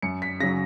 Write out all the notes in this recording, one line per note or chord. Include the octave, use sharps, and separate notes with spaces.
F#2 C#7
B6
C#3 F#3 A#6